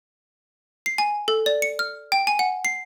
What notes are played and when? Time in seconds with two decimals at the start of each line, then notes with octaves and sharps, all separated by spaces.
0.86 C7
0.98 G#5
1.28 A4
1.46 D5
1.62 C#7
1.79 F6
2.12 G5
2.27 G#5
2.39 F#5
2.65 C7